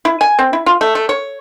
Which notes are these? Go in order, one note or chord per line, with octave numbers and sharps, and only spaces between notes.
E4
G#5
C4
E4
F4
A3
A3
C#5